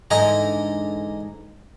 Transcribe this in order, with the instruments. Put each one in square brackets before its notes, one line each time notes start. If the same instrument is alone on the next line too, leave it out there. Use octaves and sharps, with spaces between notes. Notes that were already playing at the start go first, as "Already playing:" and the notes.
[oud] G#2 D3 E3 [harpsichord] D#5 G#5 A#5